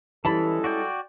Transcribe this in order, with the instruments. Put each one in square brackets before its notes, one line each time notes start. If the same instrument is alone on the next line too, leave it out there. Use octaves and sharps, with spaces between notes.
[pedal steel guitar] E3 [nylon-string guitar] G3 C#4 E4 [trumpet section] G#3 A4 [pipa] A5 B5
[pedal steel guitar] F#4 D5 G5